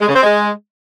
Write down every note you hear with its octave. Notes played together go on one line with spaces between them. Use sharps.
G#3
C#3
C4
G#3